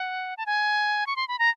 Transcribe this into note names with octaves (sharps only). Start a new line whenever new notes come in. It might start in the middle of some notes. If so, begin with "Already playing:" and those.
Already playing: F#5
A5
G#5
C#6
C6
B5
A#5